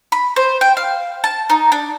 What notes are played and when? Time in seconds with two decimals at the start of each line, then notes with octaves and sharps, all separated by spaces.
0.12 B5
0.36 C5
0.61 G5
0.77 F5
1.24 A5
1.50 D#4
1.72 D4